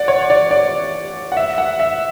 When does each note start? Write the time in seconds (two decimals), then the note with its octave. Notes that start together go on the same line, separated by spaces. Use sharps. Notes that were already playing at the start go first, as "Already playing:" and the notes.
Already playing: D5 F#5
0.08 C#5
0.30 D5
0.51 D5
1.32 F#5
1.37 E5
1.58 F#5
1.80 E5